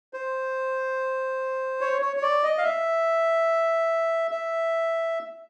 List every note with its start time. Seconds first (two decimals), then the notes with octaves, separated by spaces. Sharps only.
0.13 C5
1.81 C#5
2.02 C#5
2.16 C#5
2.22 D5
2.43 D#5
2.58 F5
2.64 E5
4.31 E5